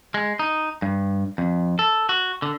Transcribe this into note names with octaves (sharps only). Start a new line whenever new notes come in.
G#3
D#4
G2
F2
A4
F#4
D3